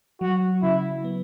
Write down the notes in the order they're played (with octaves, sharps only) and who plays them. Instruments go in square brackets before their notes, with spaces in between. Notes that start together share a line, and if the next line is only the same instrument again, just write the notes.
[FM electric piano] F#3 [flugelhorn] F#4
[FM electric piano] C#3 [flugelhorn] E4
[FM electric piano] B3